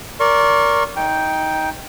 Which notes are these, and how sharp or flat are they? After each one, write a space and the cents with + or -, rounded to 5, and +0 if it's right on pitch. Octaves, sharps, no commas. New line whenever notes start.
A#4 +0 D5 -30 C#6 -40
D#4 +15 G5 +0